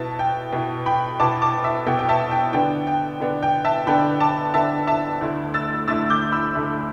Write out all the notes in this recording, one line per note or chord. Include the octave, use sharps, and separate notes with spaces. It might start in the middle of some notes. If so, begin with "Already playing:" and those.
Already playing: B2 B3 E4 E5 A5
G5
B2 B3 E4
G5 B5
B2 B3 E4 A5 D6
A5 D6
E5
B2 B3 E4 G5
G5
E5 A5
G5
D3 B3 D4 G5
G5
D3 B3 D4
G5
E5 A5
D3 B3 D4 G5 B5
A5 D6
D3 B3 D4 E5 A5
E5 A5
D2 D3 A3 E4
E6 A6
D2 D3 A3 E4 E6 A6
D6 G6
B5 E6
D2 D3 A3 E4